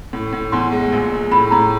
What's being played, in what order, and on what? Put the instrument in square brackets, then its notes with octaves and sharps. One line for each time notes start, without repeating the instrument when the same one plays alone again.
[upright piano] A2
A2
[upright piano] E2 [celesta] C6
[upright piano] G#3
A#1
G#3
[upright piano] A2 [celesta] B5
[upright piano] A2 [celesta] A#5